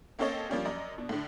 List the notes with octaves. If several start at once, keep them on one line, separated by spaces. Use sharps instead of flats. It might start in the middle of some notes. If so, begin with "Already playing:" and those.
A#3 C4 C#4 A4 C#5 D#5
F3 G3 A#3 C#4 D4 G4
F#2 D5 D#5 A#5
B2 D4
A2 D3